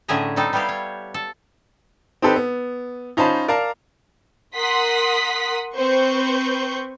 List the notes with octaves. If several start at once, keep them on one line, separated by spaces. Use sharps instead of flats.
A2 D3 C#4 G#4 E5 A#5
G3 C4 D#4 A4
G3 B3 E4 G4 F5
C#5
A4
C4 D#4 G4 A4 B4
B3
C#4 D#4 F4 C5 A5 B5
A#4 D5 F5 A5 A#5
A#4 F#5 C6 D#6 B6
C4 B4 C5 C#6 G6